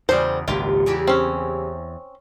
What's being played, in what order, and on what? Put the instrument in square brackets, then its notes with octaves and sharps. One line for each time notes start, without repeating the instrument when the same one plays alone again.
[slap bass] E2 [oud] C#3 F#4 [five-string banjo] G3 C5
[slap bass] G#1 C#2 A#2 [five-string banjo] F4 [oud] G4
[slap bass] E2 [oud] C#3 E3 G4
[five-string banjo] C4 C#4